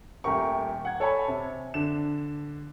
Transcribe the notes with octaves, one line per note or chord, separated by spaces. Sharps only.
D#1 A3 G4 A#4 C#6
F#5 G#6
A4 C#5 G#5 A5 B5
C3
D3 D4 E7